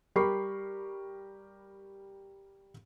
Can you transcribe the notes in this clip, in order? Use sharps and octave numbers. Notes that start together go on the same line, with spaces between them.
G3 G4 A#4 B5 C#6 C7